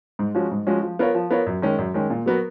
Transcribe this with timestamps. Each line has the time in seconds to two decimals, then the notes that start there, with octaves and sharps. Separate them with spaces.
0.19 G#2
0.35 F3 G#3 C#4 F#4
0.51 G#2
0.67 F3 G#3 C#4 F#4
0.82 F3
0.99 B3 F4 A#4 C#5
1.15 F3
1.30 B3 F4 A#4 C#5
1.46 F#2
1.62 D#3 G#3 C#4
1.78 F#2
1.94 D#3 G#3 C#4
2.10 A#2
2.26 F#3 B3 F#4 A#4